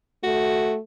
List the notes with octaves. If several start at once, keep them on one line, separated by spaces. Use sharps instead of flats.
A3 F#4